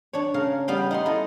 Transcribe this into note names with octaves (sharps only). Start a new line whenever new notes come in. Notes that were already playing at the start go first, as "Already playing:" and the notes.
D4 C#5
C#3 A#4 F5
G3 B3 F5 G5
D#4 F#5 C6
E4 A4 D#5